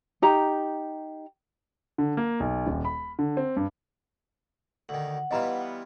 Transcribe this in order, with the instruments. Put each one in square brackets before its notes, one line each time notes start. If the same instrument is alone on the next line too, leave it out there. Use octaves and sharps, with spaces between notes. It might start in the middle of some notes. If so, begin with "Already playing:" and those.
[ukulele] D#4 G4 A#5
[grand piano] D3
A#3
B1
D#1
B5
D3
C4
G2
[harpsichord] D2 D#3 [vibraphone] F#5
[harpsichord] E3 G3 F4 [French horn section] B3 [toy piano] D#5 A#5